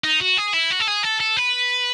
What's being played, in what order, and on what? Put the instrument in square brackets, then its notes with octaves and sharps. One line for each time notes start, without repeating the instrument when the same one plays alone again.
[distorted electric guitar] D#4
F#4
G#4
E4
F#4
A4
G#4
A4
A4
B4